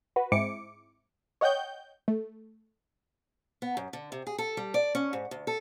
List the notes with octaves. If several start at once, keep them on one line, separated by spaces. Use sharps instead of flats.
F#4 B4
G#2 G#3 C4 E4 D6 C#7
C#5 D#5 F#5 G5 G6
A3
B3
F#2
D3
C3
G#4
A4
G3
D5
C#4
G#2
D2
A4